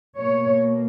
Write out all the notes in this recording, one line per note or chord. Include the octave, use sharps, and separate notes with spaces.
B2 A#3 C#5